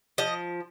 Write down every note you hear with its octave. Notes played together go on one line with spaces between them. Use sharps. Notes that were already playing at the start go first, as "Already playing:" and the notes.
F3 D#5